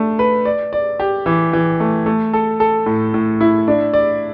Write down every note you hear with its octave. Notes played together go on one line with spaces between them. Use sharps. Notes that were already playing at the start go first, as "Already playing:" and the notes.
Already playing: A3 D4
B4
D5
D5
G4
E3
E3
A3
A3
A4
A4
A2
A2
E4
D4
D5